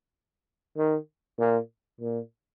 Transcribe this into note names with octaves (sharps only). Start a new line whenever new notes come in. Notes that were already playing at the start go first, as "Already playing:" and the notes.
D#3
A#2
A#2